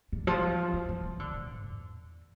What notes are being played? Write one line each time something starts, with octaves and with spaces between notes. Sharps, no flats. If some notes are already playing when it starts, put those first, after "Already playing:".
D3
F3
E3
E3
E3
D3
A#2
E2